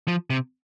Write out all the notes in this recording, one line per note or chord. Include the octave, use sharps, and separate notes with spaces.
F3
C3